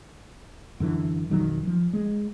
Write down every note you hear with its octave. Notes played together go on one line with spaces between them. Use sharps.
F#2 D3 E3
B1 F2 D#3 F#3
F3
G#3